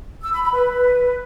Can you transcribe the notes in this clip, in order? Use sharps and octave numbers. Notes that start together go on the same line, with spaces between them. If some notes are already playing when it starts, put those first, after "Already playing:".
E6
B5
B5
B4